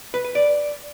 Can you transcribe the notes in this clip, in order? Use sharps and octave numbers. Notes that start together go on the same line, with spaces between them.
B4
B4
D5